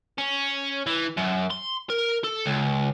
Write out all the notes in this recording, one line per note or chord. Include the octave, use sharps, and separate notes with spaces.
C#4
E3
F#2
C6
A#4
A4
C#2